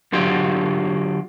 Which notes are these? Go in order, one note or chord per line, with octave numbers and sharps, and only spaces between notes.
D3 F#3 F4 G4